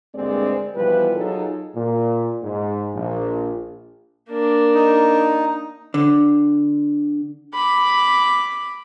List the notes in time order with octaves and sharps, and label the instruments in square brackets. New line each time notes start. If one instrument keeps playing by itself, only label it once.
[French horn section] D2 G2 G#3 A#3 C4 D5
B2 E3 F3 G3 B4
F#3 D#4 F4 G#4 A4
[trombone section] A#2
G#2
A#1
[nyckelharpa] A#3 D4
[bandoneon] D#4
[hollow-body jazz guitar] D3
[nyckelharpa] B5 D6